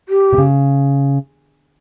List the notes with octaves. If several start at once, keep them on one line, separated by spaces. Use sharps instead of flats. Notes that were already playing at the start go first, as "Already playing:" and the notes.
G4
C3
C#3